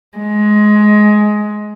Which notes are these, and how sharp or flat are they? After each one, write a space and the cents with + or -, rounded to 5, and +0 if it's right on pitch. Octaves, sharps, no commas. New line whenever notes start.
G#3 +15